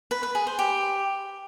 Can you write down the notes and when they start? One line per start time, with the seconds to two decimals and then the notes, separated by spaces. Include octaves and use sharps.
0.11 B4
0.23 B4
0.35 G#4
0.47 C5
0.59 G4